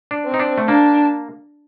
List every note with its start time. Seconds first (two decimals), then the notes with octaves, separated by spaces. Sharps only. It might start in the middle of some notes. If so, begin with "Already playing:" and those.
0.11 D4
0.25 C4
0.34 D#4
0.39 D4
0.58 A3
0.68 A#3 D4